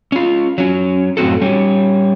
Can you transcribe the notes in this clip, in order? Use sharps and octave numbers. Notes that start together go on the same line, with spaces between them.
C#4 F4
F#3 C#4
F#2 A2 C4 F#4 A4
G3 C#4